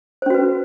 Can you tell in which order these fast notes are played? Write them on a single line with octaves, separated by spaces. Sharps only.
C5 C#4 F#4 B4